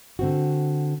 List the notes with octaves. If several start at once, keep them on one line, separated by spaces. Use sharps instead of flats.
D3 C4 F#4